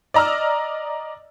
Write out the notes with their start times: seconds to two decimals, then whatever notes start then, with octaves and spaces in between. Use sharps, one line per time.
0.14 D5 D#5 A#5 E6 F6